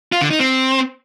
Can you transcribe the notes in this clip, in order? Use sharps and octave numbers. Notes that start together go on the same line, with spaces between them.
F4
D3
D#4
C4